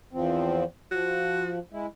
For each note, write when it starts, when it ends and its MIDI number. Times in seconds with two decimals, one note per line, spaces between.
0.13 0.64 40
0.13 0.64 53
0.13 0.64 60
0.91 1.59 53
0.91 1.57 66
1.72 1.86 56
1.72 1.86 64